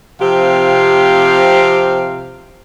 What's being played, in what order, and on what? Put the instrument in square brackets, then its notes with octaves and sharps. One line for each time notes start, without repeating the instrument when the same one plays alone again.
[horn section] C3 F3 C4 G4 F5